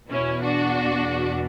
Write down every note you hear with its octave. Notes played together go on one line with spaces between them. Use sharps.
E2 B2 C#4 E4
D4 F#4